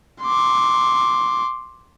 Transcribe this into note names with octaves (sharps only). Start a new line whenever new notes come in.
C6 D6